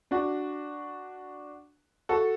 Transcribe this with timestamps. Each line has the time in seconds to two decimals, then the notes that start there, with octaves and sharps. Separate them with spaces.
0.11 D4 F#4
2.09 F#4 A4